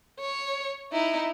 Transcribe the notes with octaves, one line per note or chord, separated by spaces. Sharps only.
C#5
D#4 E4